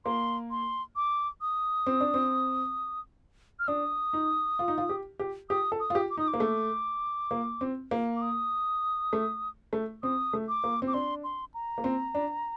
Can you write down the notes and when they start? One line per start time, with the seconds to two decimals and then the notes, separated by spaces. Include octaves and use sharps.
0.05 A#3 C6
0.51 C6
0.96 D6
1.41 D#6
1.87 C4
2.00 D4
2.14 C4
3.59 F6
3.68 D4 D#6
4.13 D#4
4.59 F4
4.68 D#4
4.78 F4
4.89 G4
5.19 G4
5.50 G4 D#6
5.72 A4
5.80 D#6
5.90 F4
5.95 G4
6.10 D6
6.17 D#4 D#6
6.28 D6
6.34 A#3
6.40 A3
7.31 A#3
7.61 C4
7.91 A#3
8.16 D6
8.22 D#6
9.13 A3
9.73 A3
10.03 C4 D#6
10.33 A3
10.48 D6
10.64 A#3
10.82 C4
10.88 D6
10.94 D4 C6
11.24 C6
11.54 A#5
11.78 A#3
11.84 C4
12.15 D4